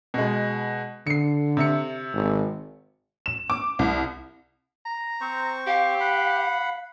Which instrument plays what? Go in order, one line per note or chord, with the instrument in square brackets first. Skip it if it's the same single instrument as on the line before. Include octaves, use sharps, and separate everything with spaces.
[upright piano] B2 G#3
[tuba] D3 [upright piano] C7 C#7
[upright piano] C3 E5 C#7
[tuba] G#1
[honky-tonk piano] E7
D6
C2
[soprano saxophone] A#5
[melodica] C4 C5 C#6
[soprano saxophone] G4 [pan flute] F5
[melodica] F#5 B5